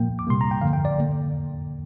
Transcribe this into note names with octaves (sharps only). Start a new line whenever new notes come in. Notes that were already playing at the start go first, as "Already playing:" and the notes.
Already playing: A#2 F3 A#3 G5
D6
C3 G3 A#3 C6
A#5
G5
G2 D3 F3 F5
G5
D5
D3 A#3